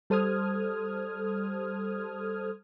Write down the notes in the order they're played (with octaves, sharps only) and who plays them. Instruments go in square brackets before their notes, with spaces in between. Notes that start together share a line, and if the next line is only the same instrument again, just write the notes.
[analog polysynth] G3 A4 C5 D#6 F6 G#6